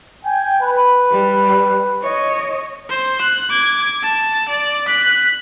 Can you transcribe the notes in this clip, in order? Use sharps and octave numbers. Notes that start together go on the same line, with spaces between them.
G5 G#5
B4
G3
C#5 D#5
C5
F#6
D6 G#6
A5
D5
F#6 B6